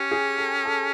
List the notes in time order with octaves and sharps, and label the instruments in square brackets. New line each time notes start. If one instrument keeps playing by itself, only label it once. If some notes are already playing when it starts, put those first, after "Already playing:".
Already playing: [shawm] C#4 [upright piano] G4
[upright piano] G#4
A4
A4